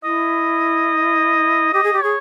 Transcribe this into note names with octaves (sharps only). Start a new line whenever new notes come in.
E4 D#5
G4 D#5
G#4
G4
G#4 C#5